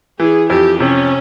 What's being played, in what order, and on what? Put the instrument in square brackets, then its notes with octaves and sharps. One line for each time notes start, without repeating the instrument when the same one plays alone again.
[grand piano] E3 [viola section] G#4
[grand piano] F2 [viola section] G4
[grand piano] C3 [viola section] C#4